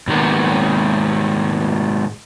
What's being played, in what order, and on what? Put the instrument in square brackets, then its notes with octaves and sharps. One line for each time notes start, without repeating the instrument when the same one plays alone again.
[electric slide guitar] G#2 D#3 G#3 A#3 B3